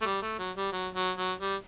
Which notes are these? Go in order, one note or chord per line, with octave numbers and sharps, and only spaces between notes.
A3
G3
A3
F#3
G3
F#3
F#3
F#3
G3